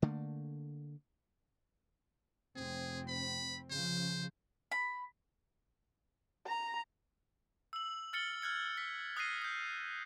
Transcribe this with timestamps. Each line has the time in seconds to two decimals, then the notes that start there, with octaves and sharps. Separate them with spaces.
0.02 D3 A3 A#3
2.56 F1 C4 G#4
3.08 B5
3.71 C#3 F3 C5
4.72 B5
6.46 A#5
7.73 E6 F#7
8.13 F6 A6 C#7 F#7 G7
8.42 F6 F#6 G#6 C#7
8.78 B6
9.17 D#6 F#6 G#6 A#6 C7 D#7
9.42 D#6 G6